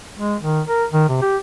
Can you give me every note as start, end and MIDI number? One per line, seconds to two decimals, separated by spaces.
0.19 0.36 56
0.41 0.61 51
0.66 0.85 70
0.92 1.05 51
1.09 1.17 48
1.22 1.37 67